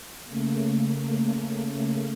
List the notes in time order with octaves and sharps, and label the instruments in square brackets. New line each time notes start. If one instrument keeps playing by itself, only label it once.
[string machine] C#3 A3 A#3